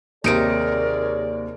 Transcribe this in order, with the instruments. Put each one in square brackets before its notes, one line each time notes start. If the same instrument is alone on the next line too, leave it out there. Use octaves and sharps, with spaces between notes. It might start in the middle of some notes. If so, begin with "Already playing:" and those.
[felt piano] D#2 D7 [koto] C3 D#4 [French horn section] G#4 C#5 D5 [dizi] A#4